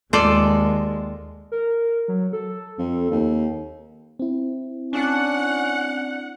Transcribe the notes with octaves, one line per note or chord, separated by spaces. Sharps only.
D#2 G#3 F4 A4 D5
A#4
F#3
A4
F2
D#2
C4 E4
C#4 D4 F#5